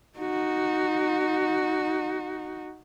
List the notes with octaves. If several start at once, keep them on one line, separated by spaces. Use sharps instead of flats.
D#4 F#4